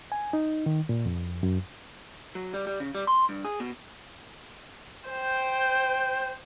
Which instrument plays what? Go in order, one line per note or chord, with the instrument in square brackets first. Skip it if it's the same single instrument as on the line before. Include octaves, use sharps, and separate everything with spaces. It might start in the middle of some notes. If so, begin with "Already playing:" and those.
[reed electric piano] G#5
D#4
D#3
A#2
F2
F#2
[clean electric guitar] F#3
G3
G3
C#3
G3
C6
G2
G#4
B2
[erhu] C5 [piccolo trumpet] G5